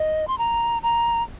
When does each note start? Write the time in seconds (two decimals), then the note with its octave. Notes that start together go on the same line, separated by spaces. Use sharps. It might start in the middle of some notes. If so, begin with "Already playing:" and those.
Already playing: D#5
0.27 C6
0.38 A#5
0.83 A#5